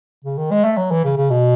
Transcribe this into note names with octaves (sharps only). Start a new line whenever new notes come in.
C#3
D#3
G#3
A3
F#3
E3
C#3
C#3
B2